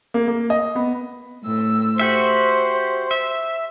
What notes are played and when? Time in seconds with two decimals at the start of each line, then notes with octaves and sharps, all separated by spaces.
0.14 A#3
0.28 A#3
0.50 D#5
0.75 B3
1.43 A2 E6
1.99 F#4 G4 C5 E5
3.11 E5